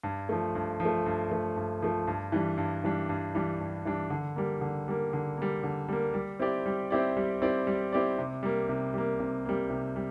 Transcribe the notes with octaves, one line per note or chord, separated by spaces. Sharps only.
G2
F3 A3
G2
F3
A3
G2
F3 A3
G2
F3 A3
G2
E3 G3 D4
G2
E3 G3 D4
G2
E3 G3 D4
G2
E3 G3 D4
D3
G3 A#3
D3
G3 A#3
D3
G3 A#3
D3
G3 A#3
G3
C4 E4 G4 D5
G3
C4 E4 G4 D5
G3
C4 E4 G4 D5
G3
C4 E4 G4 D5
C3
G3 A#3
C3
G3 A#3
C3
G3 A#3
C3
G3